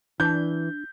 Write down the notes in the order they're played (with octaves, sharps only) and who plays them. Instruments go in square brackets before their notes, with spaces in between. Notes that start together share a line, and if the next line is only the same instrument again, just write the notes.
[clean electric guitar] E3 [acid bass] D4 [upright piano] G6